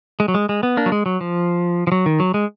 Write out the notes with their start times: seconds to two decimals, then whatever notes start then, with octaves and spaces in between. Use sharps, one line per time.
0.20 G#3
0.28 F#3
0.34 G#3
0.49 G#3
0.63 B3
0.77 A#3 D4
0.86 F#3
0.92 G#3
1.06 F#3
1.21 F3
1.87 F3
1.92 F#3
2.06 D#3
2.20 F#3
2.34 G#3